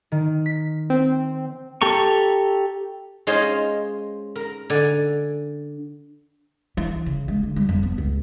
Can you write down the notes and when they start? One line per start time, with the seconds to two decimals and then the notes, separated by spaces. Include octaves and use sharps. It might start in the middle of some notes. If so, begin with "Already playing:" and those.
0.12 D#3
0.46 B6
0.90 C4
1.82 G4 A4 A#5 C#6
3.27 G#3 C#4 F4 G#4 C5 D#5
4.36 A#4
4.70 D3 D5 G#5
6.77 E3
7.06 C#3
7.28 G#3
7.43 D3
7.56 G3
7.69 F2
7.83 B3
7.98 C#2